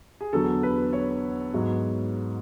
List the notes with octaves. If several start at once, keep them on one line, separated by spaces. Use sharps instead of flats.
G#4
E2 D3 F#3 A4
B4
C#5
G#2 F#3 B3